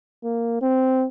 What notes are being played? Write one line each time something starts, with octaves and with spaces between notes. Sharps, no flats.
A#3
C4